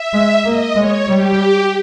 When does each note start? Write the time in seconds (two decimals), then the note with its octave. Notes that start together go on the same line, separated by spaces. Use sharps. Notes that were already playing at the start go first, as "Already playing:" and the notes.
Already playing: E5
0.13 G#3
0.44 A#3 D#5
0.76 G#3 C#5
1.07 G3 G4